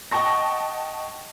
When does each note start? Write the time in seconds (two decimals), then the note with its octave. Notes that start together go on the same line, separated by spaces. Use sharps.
0.11 D#5 F#5 G5 A5 C#6 A#6